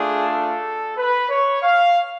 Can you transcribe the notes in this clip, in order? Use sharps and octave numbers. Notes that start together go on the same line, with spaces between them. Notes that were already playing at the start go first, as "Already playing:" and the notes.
Already playing: A3 D4 F4 G#4
A4
B4
C#5
F5